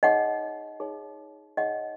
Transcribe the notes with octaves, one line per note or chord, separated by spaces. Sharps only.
D#4 G#4 C#5 D#5 F#5
D#4 G#4 C#5
D#4 G#4 C#5 D#5 F#5